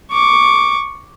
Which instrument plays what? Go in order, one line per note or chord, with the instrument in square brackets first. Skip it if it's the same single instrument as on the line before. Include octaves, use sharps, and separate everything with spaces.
[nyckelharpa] C#6 D6